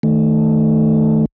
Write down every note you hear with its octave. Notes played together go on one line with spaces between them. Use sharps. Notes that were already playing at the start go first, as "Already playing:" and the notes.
D#3 A3